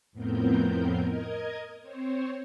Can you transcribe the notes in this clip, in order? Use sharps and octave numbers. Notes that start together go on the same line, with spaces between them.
F2 A2 B3 C4 A#4 G6
A#4 D#5 G#6
C4 C5 C#5